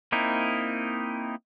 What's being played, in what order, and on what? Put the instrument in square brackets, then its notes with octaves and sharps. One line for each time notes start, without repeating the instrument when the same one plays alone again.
[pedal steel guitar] A#3 C4 D#4 E4